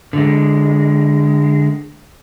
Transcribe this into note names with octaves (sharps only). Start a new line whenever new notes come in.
D3 G#3